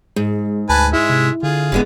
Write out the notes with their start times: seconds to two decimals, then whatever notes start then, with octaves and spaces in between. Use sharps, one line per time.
0.16 G#2 G#3
0.69 D2 B4 G#5 A5
0.93 G#3 E4 E5
1.10 C3
1.43 D3 F4 G#4
1.72 F1 D3 G#3 B3